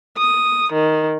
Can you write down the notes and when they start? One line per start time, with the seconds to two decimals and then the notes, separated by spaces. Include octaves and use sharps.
0.18 D#6
0.73 D#3